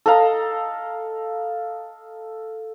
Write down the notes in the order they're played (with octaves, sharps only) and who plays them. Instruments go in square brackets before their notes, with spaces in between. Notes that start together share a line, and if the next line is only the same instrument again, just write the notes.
[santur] A4 D#5 F5 A#5